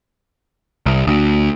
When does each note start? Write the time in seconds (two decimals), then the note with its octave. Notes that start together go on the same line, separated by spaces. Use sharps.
0.86 C2
1.07 D2